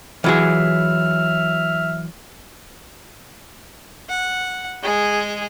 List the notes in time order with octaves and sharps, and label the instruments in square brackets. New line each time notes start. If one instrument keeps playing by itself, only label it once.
[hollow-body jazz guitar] E3 F#3 G#4 [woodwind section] E5 F6
[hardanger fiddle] F#5
G#3 G#4